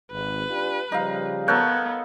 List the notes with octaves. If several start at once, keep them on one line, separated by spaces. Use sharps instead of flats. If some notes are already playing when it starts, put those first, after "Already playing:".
G#1 B4
D4 F4 G4
C#3 F3 G3 D#4 F5
B3 A4 A#4 C#5 F#6 G6